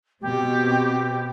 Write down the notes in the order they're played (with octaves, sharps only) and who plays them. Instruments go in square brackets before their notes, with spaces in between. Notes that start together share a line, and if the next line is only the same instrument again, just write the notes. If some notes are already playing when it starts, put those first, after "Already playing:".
[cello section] B2 C4 [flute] G4